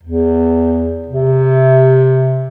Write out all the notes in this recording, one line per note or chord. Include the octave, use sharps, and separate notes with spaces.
E2
C3